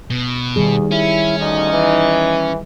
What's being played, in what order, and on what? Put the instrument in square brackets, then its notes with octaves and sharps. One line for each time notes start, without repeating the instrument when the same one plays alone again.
[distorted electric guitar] B2
[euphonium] E2 [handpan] D#3 G3 G#4
[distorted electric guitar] C#4 [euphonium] E4
[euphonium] D2 [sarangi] D#4
[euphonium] E3